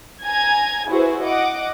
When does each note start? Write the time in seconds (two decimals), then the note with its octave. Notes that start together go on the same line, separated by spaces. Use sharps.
0.25 G#5 A#5 G#6
0.89 E4 F#4 G#4 B4 C5
1.22 D#5 F#5 D6